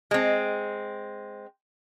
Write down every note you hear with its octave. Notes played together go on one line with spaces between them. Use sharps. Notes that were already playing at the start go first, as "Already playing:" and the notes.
G#3 C4